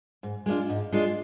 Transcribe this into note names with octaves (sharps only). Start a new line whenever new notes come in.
G#2
G#3 D4 F4
G#2
G#3 D4 F4